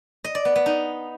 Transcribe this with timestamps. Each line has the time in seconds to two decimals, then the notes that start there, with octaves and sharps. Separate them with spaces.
0.24 D#5
0.35 D5
0.45 B3
0.56 B3
0.66 D#4